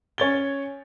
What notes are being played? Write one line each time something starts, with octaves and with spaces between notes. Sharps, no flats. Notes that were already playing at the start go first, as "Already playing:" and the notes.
C#4 C#5 A6 G7